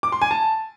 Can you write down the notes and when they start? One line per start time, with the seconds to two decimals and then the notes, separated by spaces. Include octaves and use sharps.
0.03 D6
0.12 C6
0.22 G#5
0.31 A5